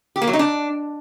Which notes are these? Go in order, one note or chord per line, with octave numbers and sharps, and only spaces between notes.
G4
A#3
F#3
D#4
D4